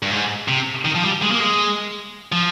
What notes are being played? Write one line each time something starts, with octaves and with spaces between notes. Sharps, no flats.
G2
G#2
C3
D#3
F3
G3
G#3
A#3
G#3
F3